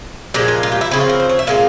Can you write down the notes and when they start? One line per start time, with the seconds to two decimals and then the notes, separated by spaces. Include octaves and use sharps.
0.34 A#2 F3 G#3 G4
0.48 F4
0.63 F4
0.72 G4
0.81 E4
0.91 C#3 F3 C4 E4
1.00 F4
1.09 A#4
1.20 C5
1.29 C#5
1.39 E5
1.47 A#2 G#3 C4 F5